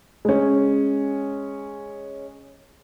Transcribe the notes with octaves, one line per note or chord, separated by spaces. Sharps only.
G#3 C#4